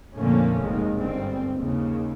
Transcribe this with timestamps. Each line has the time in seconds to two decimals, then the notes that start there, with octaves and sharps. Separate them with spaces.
0.16 F2 A#2 D3 A3 A#3 C#4
0.61 F1 D#2 C3 D#3 G#3
0.95 G1 G#2 G3 C4
1.56 D#2 C#3